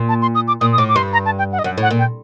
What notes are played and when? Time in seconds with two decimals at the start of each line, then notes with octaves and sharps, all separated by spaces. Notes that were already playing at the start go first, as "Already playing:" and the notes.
Already playing: A#2
0.09 A5
0.22 C6
0.35 D#6
0.48 D6
0.61 A#2 D#6
0.73 D#6
0.78 A2 D6
0.89 D6
0.96 G2 C6
1.13 A#5
1.25 A5
1.39 G5
1.52 F#5
1.59 D#5
1.64 F#2 F#5
1.78 A2 F#5
1.90 A#2
1.99 G5